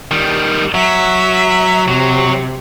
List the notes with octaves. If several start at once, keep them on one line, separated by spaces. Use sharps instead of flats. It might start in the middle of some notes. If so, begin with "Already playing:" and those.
D#3 G3
F#3 E5
C3 F#3